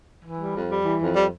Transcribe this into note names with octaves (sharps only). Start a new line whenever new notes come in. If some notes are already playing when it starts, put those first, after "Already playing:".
E3
G3
F2
G3
E3
F2
G3